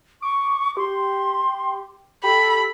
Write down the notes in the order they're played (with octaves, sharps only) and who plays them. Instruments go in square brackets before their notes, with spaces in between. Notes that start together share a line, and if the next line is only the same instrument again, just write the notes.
[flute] C#6 [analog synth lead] D6
[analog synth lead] G4 [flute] C6
[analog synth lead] G4 [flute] A4 [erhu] B5